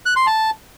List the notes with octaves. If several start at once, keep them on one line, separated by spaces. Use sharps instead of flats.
F#6
C6
A5